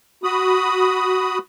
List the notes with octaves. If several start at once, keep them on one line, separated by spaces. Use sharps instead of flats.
F#4 B5 D#6